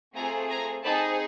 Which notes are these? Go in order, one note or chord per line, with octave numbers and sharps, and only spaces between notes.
A3 C4 F4 G#4 G#5 A#5
G#5 A#5
C4 D#4 G#4 A5 B5